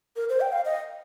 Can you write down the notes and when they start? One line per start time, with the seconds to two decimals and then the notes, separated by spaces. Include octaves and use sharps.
0.16 A#4
0.29 C5
0.41 G5
0.52 F5
0.65 D#5